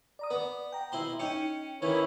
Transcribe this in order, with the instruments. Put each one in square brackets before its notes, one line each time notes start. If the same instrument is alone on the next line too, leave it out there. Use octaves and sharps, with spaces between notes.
[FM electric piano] D5 A#5 D#6
[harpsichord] B3 [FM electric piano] B4 D5
[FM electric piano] G5 A#5
[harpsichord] B1 E4 C6
[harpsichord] C#4 C#5 [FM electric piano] D#4 G5 C#7
[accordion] D#3 E4 C#5 [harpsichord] E3 C#4